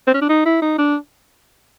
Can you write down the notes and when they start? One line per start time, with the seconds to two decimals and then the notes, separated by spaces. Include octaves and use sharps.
0.07 C4
0.14 C#4
0.22 D4
0.29 D#4
0.45 E4
0.62 D#4
0.78 D4